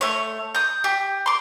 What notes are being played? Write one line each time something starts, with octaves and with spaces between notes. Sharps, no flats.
A3 C#5
D#6 G6
G4
C6 D6